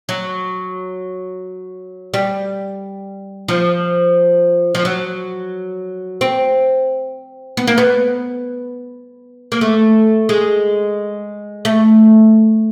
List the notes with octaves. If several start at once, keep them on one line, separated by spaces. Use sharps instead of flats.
F#3
G3
F3
F3
F#3
C4
B3
A#3
B3
A#3
A3
G#3
A3